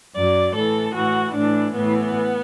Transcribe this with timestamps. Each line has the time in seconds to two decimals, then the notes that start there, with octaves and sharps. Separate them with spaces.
0.16 F#2 F#3 D5
0.55 A2 E3 A4
0.96 A2 E3 F#4
1.35 A2 E3 D4
1.75 A2 E3 B3